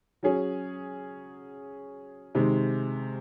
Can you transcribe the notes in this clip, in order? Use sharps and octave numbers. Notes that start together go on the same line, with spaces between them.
F#3 C#4 G#4
C3 D#3 G#3